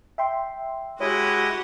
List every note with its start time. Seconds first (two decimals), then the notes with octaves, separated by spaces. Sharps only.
0.18 E5 G5 C6
1.00 G#3 E4 F#4 G4 C#5 D#5 F#5